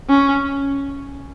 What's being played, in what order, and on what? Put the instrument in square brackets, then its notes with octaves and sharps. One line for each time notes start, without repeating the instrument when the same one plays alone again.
[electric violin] C#4